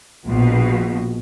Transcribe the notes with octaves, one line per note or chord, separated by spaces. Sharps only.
A#1 B2